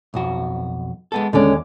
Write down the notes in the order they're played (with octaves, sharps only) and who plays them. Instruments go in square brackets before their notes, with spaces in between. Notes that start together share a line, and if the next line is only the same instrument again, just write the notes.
[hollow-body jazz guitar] B1 F2 F#4
G#3 B3 A4
[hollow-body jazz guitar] D#2 D5 [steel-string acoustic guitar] D3 G#3 C#4